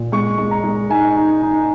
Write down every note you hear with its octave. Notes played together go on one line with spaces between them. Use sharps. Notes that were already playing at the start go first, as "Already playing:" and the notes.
Already playing: A#2
G#3 C#6
G#3
A#5
G#3
D#4 G#5
D#4
D#4